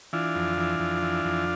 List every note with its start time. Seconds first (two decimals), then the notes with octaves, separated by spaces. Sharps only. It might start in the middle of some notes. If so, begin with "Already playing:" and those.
0.13 E3 D4 F4
0.35 F2
0.57 E3
0.79 F2
1.03 E3
1.25 F2